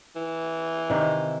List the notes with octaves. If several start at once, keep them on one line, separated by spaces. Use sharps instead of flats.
E3
C3 D#3